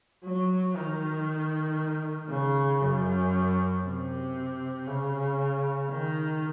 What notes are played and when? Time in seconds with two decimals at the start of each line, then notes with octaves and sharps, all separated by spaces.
0.24 F#3
0.76 D#3
2.29 C#3
2.81 F#2
3.84 C3
4.87 C#3
5.89 D#3